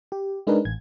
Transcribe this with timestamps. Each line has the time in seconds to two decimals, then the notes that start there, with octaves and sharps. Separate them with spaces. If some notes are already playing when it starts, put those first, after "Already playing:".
0.12 G4
0.47 G#3 D4 D#4 G#4 A#4 B4
0.65 A1 G#6